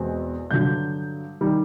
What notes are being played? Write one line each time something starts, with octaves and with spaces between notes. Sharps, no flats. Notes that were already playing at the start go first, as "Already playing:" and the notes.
Already playing: E2 B2 G#3 C4
G2 D3 F#3 G6
D#3 G3